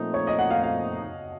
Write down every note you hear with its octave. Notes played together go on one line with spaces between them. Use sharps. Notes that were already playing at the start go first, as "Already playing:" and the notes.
Already playing: A#2 F3 A3 C4 D#4
C#5
D#5
F#5
F5
F5